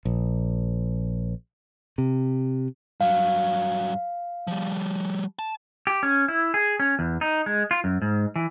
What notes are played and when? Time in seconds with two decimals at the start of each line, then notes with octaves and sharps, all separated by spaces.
0.05 A#1
1.98 C3
3.01 G2 F#3 F5
4.47 F3 G3
5.39 A5
5.87 G4
6.03 C#4
6.28 E4
6.54 G#4
6.80 C#4
6.99 E2
7.21 D#4
7.46 G#3
7.71 F4
7.84 F#2
8.02 G#2
8.36 E3